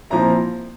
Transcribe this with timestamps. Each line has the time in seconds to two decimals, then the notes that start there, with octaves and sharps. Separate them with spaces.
0.10 A#2 F3 C4 E4 A#5